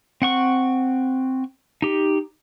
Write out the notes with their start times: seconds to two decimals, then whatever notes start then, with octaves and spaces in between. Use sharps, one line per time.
0.22 C4 F#5 C#6
1.82 D#4 G4